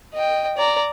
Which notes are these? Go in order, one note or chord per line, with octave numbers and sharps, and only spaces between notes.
D#5 G5
D5 A#5